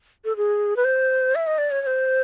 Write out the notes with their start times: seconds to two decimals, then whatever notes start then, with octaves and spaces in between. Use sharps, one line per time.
0.25 A4
0.37 G#4
0.76 B4
0.85 C5
1.35 E5
1.47 D#5
1.58 D5
1.71 C#5
1.82 C#5
1.87 C5